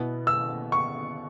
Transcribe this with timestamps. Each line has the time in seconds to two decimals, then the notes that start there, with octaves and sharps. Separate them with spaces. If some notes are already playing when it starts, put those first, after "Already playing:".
Already playing: B2 B3 E4
0.27 E6
0.72 C#6